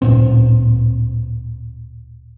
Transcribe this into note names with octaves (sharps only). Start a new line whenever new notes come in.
D1 G1 A#2 C4